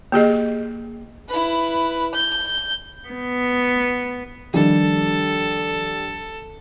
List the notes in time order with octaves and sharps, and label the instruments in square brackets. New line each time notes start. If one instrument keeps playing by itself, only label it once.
[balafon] A#3 G4 G#4 D#5
[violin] E4 B4
G6
[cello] B3
[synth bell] D#3 F3 [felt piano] G3 D4 G4 [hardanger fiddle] A4